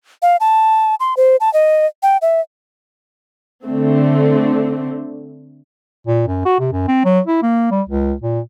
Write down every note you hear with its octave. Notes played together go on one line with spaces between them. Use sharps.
F5
A5
C6
C5
A5
D#5
G5
E5
D3 A3 C4
A#2
F#2
F#4
C3
F#2
C4
F#3
E4
A#3
G3
C#2
A#2